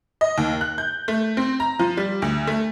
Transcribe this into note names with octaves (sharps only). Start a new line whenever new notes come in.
D#5
D#2
F#6
G6
A3
C4
A#5
F3
G3
D2
A3